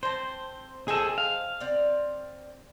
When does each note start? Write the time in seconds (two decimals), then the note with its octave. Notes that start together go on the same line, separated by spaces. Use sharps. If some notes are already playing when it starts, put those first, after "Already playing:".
0.03 C4 C5 A5
0.88 G#4 A4 C5 D#5 G5
1.18 F5
1.60 C4 D5